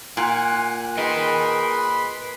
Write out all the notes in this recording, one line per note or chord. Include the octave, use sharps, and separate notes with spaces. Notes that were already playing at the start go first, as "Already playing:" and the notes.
A#2 F#5 G#5 F#6
G#4 A#4 B4 D#5 B5 C6